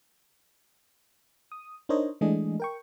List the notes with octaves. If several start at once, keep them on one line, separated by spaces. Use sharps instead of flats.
D#6
D4 D#4 A#4 C5 C#5 D#5
E3 G#3 A3 D4 G#4 D#5
A#4 G5 C#6